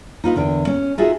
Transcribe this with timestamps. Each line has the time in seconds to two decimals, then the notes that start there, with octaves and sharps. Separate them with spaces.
0.24 D#4 F4 B4 D#5
0.36 E2 D3 A#4 G5
0.67 C#4
0.98 D#4 F4 F#4 G#4 A4 E5